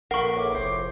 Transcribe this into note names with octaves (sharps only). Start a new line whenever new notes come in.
A#1 A#4 B4 F#5 C#6
A2 G#4 D6
F1 C5